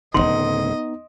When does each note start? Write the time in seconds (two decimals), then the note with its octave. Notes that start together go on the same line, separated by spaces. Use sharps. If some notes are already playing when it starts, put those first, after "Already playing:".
0.14 D1 G#1 C#3 B3 D#4 D#5 C6